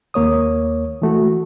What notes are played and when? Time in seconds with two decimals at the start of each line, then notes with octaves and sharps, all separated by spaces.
0.14 D#2 A#3 C#5 D#6
1.02 E3 A3 F#4